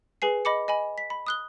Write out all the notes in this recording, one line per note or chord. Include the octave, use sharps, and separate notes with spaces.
G#4 B4 G#5 C7
D#5 B5 D6 C#7
D#5 G#5 B5
B6
B5
D#6 F#6 G7